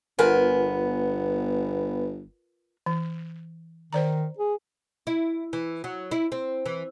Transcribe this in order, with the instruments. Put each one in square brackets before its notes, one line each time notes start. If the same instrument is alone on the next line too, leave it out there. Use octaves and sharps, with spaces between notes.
[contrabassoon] G1 [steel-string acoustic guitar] B3 G#5 [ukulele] F4 A#4 B4
[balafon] E3
[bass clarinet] D#3 [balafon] C5 D5 A#5
[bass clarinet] G#4
[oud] E4
E3
F#3
E4
C4
E3